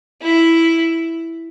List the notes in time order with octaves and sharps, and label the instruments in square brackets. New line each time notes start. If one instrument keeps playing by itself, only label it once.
[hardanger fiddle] E4